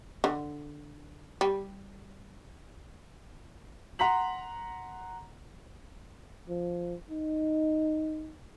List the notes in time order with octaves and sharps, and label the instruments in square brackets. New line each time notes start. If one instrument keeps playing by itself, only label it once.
[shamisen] D3
G3
[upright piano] F#5 A#5 C6 B6 F#7
[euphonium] F3
D#4